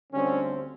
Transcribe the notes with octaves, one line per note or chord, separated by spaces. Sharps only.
D2 D3 G3 C4 C#4